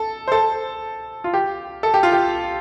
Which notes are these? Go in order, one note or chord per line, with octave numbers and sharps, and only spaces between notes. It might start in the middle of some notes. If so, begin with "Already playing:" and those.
Already playing: A4
C5
A4
F4
G4
A4
G4
F4
G4